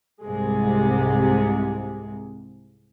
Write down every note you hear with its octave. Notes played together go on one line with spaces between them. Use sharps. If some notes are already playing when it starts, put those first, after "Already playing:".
C2 G#2 C3 G#3